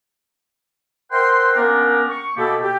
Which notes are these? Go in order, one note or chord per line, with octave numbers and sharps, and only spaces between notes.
A#4 C5 E5 F#5 G5 C6
A#3 B3 C#4 D4 G4 A#4
C#6
B2 A#3 B3 E4 G4 A4
G4